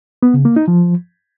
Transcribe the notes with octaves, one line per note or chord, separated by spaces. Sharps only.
B3
C#3
A#3
D#4
F3